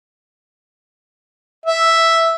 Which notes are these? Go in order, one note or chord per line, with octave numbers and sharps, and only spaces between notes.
E5